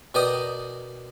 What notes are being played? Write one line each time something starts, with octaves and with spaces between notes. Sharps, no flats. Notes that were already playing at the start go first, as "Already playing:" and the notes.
B2 A#4 D5 D#5 G5 D#6